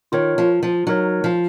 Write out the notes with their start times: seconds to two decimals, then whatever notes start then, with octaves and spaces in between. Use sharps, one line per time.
0.12 D#3 F4 A#4 C#5
0.38 F3
0.63 F3
0.87 F#3 D#4 A#4 C#5
1.24 F3